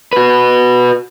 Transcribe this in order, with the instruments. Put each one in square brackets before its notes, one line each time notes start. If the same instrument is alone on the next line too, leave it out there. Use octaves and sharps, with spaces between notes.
[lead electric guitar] F#4 B4